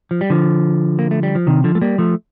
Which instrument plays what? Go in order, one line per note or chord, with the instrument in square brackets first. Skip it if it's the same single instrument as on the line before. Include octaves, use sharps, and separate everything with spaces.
[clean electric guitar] F3
G3
D3 F3
A#3
A3
G3
F3
C3 D#3
D3 F3
A3
G3 A#3
F3 A3